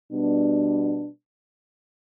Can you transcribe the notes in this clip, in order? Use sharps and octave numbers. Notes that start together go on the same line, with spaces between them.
B2 G3 B3 D4